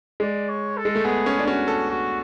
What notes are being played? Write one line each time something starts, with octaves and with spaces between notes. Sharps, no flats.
G#3 D5
C#5
A4
G#3
A3
B3 G#4
C#4
D4
C#4 F#4
A4
F#4